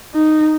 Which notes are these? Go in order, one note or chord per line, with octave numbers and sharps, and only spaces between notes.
D#4